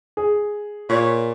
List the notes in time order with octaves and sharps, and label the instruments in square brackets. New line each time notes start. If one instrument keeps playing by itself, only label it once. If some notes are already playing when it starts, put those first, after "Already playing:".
[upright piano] G#4
[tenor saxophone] A#2 [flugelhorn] C#5